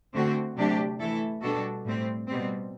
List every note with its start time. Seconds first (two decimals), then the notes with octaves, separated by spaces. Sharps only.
0.14 D3 A3 C4 F#4
0.57 C3 F#3 A3 D4 G4
1.00 E3 A3 E4 A4
1.42 B2 G3 D4 F#4 A4
1.85 A2 G3 C4
2.27 B2 G3 C4